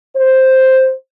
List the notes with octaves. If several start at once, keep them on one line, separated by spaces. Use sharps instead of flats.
C5